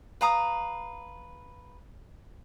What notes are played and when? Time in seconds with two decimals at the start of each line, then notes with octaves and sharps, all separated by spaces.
0.21 B4 F5 A#5 D#6